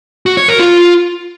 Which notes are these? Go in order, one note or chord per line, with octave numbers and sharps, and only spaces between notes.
F#4
C#5
A#4
F4